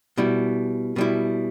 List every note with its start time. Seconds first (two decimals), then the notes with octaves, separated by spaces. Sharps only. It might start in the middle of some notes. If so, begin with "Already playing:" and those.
0.18 B2 G3 E4
0.96 B2 G3 E4